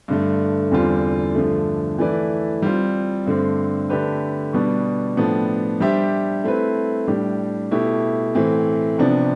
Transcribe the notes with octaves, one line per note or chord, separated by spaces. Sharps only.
G2 D3 A3
E2 D3 G3 C4 F4
G2 D3 F3 A3
E3 A3 E4 B4 D5
G3 C4 F4
G2 D3 A3 C4
D3 A3 D4 G4 B4
B2 G3 B3 D4
A2 F3 B3 D4 A4
G3 D4 G4 C5 E5
A3 C4 E4 B4
A2 G3 D4 G4
B2 A3 E4 G4
A2 E3 A3 C4
C3 F3 B3 D4